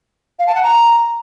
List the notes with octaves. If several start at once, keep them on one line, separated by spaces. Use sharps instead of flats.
F5
A5
F#5
A#5